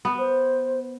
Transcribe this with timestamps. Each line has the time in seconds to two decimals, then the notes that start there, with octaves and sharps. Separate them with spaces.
0.05 B3
0.19 C5